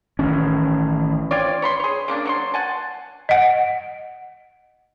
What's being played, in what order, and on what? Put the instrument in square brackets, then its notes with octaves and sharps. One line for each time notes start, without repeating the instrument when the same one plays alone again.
[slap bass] A1 D#3 C#4
[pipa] C4 F4 C#5 D5
C#5 B5 C6
G#4 C#5
C#3 A#3 D4
F#3 C#5 C6
F#5 G#5 A5
[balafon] D#5 F#5